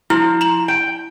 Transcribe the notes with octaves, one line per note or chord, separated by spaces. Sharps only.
F3 E4 F6
A#5 E7 F#7
G5